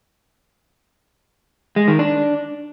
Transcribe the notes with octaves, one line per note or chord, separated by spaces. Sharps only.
G#3
D#3
D4